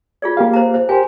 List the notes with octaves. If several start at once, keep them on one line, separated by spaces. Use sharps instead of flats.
F4 G#4 D5
A#3 G4 F5
C5 A#5
C5
G4 A#4 C5 G#5